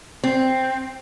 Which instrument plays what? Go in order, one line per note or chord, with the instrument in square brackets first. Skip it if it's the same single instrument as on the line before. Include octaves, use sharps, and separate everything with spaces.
[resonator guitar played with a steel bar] C4